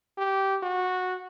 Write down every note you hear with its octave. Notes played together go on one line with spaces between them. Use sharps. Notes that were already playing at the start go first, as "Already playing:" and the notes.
G4
F#4